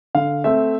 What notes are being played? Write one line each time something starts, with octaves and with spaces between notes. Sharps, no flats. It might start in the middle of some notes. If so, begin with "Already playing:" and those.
D3 F5
A3 C4 E5